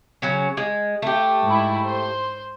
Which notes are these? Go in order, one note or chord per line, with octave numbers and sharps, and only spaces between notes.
C#3 F#3 C#4
G#3
A3 G4
G#2 E4
C5